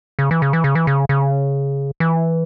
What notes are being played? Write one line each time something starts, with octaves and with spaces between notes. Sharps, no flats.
C#3
E3
C#3
E3
C#3
E3
C#3
C#3
E3